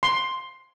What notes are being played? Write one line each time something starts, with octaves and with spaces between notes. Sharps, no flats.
C6